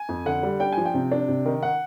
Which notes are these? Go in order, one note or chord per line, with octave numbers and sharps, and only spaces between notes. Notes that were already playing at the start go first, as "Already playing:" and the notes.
Already playing: G#5
F2
D3 F#5
G3
D4 G5
F3 G#5
G5
C3
D4
C3
D#3
F#5